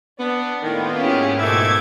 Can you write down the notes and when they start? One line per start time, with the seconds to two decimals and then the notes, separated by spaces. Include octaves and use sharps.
0.19 B3 D4
0.63 A2 D#3 A#3 B3 F4
0.98 G#2 C#4 E4 G4 G#4
1.40 B2 D#3 A3 E5 D6 G#6